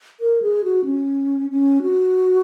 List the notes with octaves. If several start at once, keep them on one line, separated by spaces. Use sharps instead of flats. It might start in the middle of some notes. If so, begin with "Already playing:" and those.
A#4
G#4
F#4
C#4
C#4
F#4